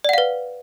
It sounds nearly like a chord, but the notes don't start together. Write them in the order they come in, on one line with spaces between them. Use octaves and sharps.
D5 F#5 F5 B4